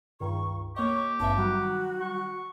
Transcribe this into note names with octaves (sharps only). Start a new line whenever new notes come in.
C#2 G2 D#3 C#6
A#3 G4 C#5 D#5 C#6
G#1 G2 E5 A5
D#3 F#3 G3 F#4
C#6